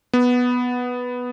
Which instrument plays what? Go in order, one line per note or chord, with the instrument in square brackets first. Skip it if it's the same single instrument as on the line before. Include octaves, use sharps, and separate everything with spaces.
[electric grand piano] B3